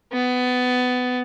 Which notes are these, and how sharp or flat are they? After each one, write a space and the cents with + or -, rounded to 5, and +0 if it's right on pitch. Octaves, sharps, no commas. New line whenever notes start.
B3 +20